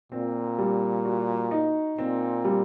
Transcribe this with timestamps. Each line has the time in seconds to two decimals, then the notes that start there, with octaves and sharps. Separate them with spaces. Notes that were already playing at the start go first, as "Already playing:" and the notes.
0.12 A#2 C4
0.58 G3
1.05 F#4
1.51 D#4
1.98 A#2 C4
2.44 G3